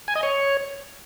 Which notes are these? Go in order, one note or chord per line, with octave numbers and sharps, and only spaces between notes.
G#5
D#5
C#5